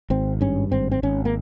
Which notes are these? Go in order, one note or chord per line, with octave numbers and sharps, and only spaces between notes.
G#1 C4
G2 C#4
G#1 C4
C4
G#1 C#4
A#3